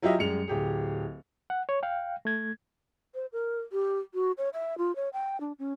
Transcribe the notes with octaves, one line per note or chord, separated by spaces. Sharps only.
F#3 E4 F4 G4 D#5 E5
F#2 G3 G#3 C#7 F7
D1 G4 G#4
F#5
C#5
F5 G5
A3 G#6
C5
A#4
G4
F#4
C#5
E5
F4
C#5
G5
D4
C#4